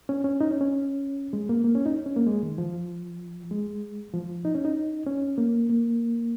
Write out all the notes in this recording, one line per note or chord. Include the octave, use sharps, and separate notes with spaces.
C#4
C#4
D#4
C#4
C#4
G#3
A#3
A#3
C#4
D#4
C#4
A#3
G#3
D#3
F3
G#3
F3
D#4
C#4
D#4
C#4
A#3
A#3